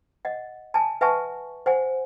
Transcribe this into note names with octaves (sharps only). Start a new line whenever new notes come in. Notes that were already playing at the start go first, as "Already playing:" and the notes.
D#5 F#5
G#5 A5
B4 E5 F#5 G#5 A5 C#6
C5 F#5 G#5